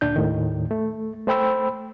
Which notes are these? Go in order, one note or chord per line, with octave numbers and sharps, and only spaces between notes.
D2 A#2 D4 G6
D#2 A2 D#3
A3
A3 C5 G5 B5 E6